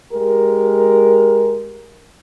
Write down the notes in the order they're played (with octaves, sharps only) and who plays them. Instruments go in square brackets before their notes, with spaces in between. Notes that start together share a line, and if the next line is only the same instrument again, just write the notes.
[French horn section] G#3 G4 A#4